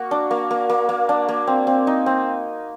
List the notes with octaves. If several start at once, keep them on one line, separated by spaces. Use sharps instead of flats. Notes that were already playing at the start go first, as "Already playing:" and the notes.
Already playing: A#3 F#4
D4
A#3
A#3
A#3
A#3
D4
A#3
C4
C4
D#4
C4